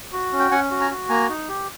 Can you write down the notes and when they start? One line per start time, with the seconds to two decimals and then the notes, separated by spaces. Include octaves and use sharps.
0.13 F#4
0.32 C#4
0.40 G5
0.51 C#4 F#5 G#5
0.71 F#4
0.81 G#5 A#5
0.91 F#4
1.09 A#3 G#5 A#5
1.29 D#4
1.49 G4